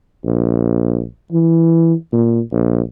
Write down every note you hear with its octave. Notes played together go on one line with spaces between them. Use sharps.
A#1
E3
A#2
A#1